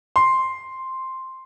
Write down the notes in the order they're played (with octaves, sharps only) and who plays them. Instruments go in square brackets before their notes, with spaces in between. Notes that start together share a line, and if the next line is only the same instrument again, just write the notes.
[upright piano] C6